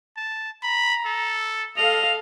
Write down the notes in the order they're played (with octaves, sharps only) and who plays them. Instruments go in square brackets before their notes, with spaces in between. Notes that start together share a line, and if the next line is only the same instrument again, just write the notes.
[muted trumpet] A5
[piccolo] A#5 [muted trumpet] B5
[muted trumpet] A4
[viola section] A4 F5 [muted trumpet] D#5 [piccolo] F7